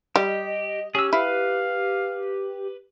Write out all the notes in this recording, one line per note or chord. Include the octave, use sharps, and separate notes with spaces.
G3 G4 D#5
C#4 G4 G#4 E6
E4 B4 F5